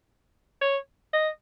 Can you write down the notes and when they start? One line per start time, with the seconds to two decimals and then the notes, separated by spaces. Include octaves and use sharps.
0.61 C#5
1.13 D#5